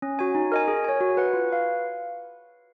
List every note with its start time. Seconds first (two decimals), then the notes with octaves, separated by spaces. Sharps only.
0.02 C#4
0.19 F#4 C#5 G#5
0.35 D#4
0.52 A#4 D#5 G#5
0.68 G#4
0.85 C#5 G#5
1.00 F#4
1.17 B4 F#5
1.33 F4
1.50 B4 F5